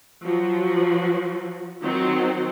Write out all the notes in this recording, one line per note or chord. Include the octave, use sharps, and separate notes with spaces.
F3 F#3 F#4
D#3 F#3 C4